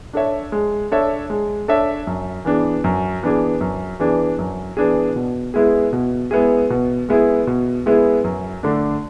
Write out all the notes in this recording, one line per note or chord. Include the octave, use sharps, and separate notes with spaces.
D4 A4 C#5 E5
G#3
D4 A4 C#5 E5
G#3
D4 A4 C#5 E5
F#2
E3 B3 D4 G#4
F#2
E3 B3 D4 G#4
F#2
E3 B3 D4 G#4
F#2
E3 B3 D4 G#4
B2
G#3 B3 E4 G#4
B2
G#3 B3 E4 G#4
B2
G#3 B3 E4 G#4
B2
G#3 B3 E4 G#4
F#2
D3 A3 D4